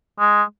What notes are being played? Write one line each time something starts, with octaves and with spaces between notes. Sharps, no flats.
G#3